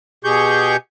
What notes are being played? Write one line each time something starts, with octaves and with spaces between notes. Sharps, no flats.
B2 G4 G#4 C#6 G6